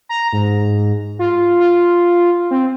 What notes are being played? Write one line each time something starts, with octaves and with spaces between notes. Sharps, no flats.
A#5
G#2
F4
F4
C4